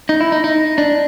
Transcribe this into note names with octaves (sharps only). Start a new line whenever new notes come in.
D#4
E4
D#4
D#4
D4